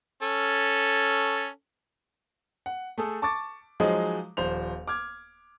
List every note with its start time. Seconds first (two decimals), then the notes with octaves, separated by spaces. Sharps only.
0.22 C#4 A4
2.66 F#5
2.98 A3 G#4 A4
3.22 A5 C#6 D6 A6
3.80 F3 F#3 G#3 D#4 G#4
4.37 D#1 F3 C5 F7
4.88 D6 F6 G#6